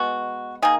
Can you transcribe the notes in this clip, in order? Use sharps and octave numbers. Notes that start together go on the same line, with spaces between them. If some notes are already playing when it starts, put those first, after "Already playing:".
Already playing: B2 G#3 B3 F#4
D#3 A#3 G#4